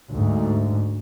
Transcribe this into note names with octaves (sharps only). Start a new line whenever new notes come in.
D2 G#2